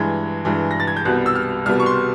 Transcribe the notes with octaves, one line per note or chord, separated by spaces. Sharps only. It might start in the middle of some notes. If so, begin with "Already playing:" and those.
Already playing: G2 E3 G#3 G#6
G2 E3 G#3
A#6
A6
G#6
G6
C2 B2 G3 B3 F#6
E6
F6
C2 B2 G3 B3 F6
C#6
C6